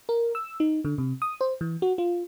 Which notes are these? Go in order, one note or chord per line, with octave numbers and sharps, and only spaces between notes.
A#4
E6
D#4
D3
C3
D#6
C5
E3
F#4
F4